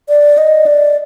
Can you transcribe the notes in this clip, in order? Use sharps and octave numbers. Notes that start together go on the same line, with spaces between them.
D5
D#5
D5